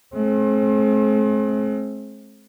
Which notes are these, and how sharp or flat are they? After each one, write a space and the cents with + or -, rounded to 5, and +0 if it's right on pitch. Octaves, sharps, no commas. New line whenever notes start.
A3 -45 C4 +35